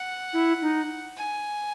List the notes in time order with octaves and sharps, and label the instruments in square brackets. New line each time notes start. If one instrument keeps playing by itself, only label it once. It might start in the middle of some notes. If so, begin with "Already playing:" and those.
Already playing: [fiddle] F#5
[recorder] E4
D#4
[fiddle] G#5